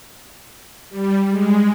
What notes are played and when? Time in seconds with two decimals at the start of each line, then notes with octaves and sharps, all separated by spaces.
0.89 G3
1.29 G#3